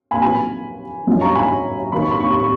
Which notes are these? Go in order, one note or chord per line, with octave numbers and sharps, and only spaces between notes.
G#5 B5
A#2 F#3 B3 G#5 B5
F#2 F3 G#3
A#5 C#6
G#5 B5
D#3 F#3 B3 B5
C#6
B5
C#6
B5
C#6